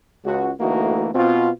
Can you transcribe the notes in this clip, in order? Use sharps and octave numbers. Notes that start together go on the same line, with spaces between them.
C#2 F#4
D2 E3 A3 A#3 D#4 F#4
B2 C4 F4